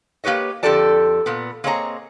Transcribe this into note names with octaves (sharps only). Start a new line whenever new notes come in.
A#3 G4 B4 C#5 D#5
F2 D3 G4 A4 D5 A5
A#2 B3
A#3 C4 G#4 C#5 D#5 A#5